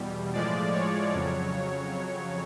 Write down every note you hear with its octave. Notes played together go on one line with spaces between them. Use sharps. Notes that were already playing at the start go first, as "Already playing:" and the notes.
Already playing: E2 B2 G3
A2 F3 G#3 D5
C#5
F2 C#3 F#3